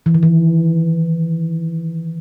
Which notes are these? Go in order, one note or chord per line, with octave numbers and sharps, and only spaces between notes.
E3
D#3
E3